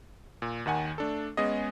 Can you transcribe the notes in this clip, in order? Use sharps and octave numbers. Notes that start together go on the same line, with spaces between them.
A#2
D#2 D#3 F#5 G#5
A3 D4 A4
G#3 B3 C#4 G#4 D#5